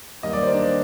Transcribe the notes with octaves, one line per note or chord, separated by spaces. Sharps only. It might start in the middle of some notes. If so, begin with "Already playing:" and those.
D#2 D#3 G3 A#3 D#5
D5
C5
D4 D5